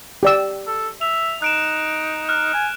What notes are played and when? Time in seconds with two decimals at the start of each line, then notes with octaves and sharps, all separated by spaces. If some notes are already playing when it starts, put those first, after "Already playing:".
0.23 G4 D5 E6
0.67 A4
1.01 E5 F7
1.42 D#4 F#6 D7 E7
2.29 F6 F#6
2.54 G#5